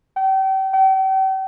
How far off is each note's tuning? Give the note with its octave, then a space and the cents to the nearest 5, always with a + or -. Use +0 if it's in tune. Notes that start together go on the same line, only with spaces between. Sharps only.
G5 -35
G5 -40